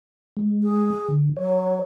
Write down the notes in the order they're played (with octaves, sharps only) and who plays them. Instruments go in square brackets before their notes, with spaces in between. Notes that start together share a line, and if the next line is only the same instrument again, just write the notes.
[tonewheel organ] G#3
[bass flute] G#4
[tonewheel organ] D3
[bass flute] F#3 [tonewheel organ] C#5